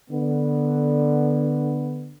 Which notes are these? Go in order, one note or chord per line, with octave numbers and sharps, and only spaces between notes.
D3 B3